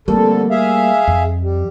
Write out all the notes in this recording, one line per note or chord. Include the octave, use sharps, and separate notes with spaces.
F2 D3 G3 A3 A#3 A4
G#4 E5 F5
F2
G3